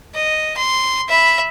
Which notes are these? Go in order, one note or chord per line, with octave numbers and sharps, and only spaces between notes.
D#5
C6
E5 B5